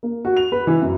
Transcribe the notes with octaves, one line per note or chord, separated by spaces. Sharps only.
A#3
F#4
F7
B4
E3
F#2